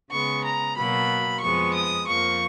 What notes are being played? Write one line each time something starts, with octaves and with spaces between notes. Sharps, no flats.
C#3 G#3 B3 C#6
A#5
B2 F#3 A#3 B5
F2 F3 G#3 B3 C#6
D#6
F2 F3 A#3 C#6